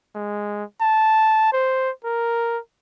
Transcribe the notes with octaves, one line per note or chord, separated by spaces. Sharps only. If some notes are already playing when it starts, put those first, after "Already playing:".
G#3
A5
C5
A#4